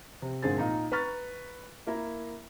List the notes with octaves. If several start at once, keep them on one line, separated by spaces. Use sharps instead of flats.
C3
G#1 D3 C4 G#4 A6
A#2 D#4 A#5
B4 A#5 C#6 F6 A6 B6
A#3 E4 A#5